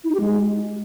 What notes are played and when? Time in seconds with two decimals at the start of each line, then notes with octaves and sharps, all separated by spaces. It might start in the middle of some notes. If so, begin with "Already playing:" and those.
0.04 E4
0.09 D#4
0.15 G4
0.20 G#3